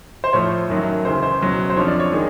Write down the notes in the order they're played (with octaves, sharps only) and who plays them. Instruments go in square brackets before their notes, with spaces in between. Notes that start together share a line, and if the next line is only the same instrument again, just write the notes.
[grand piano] C5
A2 F3 A3 C#5
F#2 D#3 F#3 A3
D2 C#3 E3 C5
C5
C#2 B2 F#3
C5
F2 D3 F3 C#5
D5
C#5
D#3 G#3